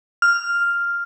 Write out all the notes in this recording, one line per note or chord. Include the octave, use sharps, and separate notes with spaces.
F6